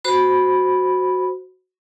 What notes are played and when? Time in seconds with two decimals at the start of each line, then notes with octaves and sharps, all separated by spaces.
0.05 F#4 C5 B5